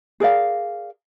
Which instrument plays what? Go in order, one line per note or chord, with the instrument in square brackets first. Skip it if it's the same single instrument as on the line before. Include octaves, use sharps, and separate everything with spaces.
[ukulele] G#4 A#4 D5 F5